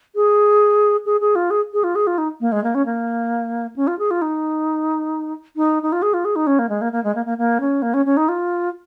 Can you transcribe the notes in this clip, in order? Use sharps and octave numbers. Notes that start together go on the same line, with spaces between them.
G#4
G#4
G#4
F4
G#4
G#4
F4
G#4
F4
D#4
A#3
G#3
A#3
C#4
A#3
C#4
F4
G#4
F4
D#4
D#4
D#4
F4
G#4
F4
G#4
D#4
C#4
A#3
G#3
A#3
A#3
G#3
A#3
A#3
A#3
C#4
A#3
C#4
C#4
D#4
F4